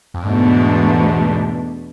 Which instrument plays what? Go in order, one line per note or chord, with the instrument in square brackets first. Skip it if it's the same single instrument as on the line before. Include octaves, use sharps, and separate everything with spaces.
[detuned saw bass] F2
[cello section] E2 B2 A3 D4 [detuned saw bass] G#2